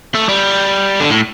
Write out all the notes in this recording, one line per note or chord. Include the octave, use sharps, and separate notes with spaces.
A3
G3
D3
A2